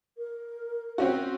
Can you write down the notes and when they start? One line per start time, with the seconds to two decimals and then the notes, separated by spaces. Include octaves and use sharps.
0.17 A#4
0.98 C4 C#4 F#4